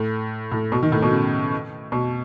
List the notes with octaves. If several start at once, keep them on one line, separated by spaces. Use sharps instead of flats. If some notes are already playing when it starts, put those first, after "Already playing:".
Already playing: A2
A2
B2
D#3
A2
B2
C#3
B2